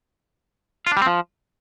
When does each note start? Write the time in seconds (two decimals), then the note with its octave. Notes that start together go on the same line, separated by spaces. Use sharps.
0.87 F4
0.92 D4
0.97 G3
1.02 C4
1.07 F3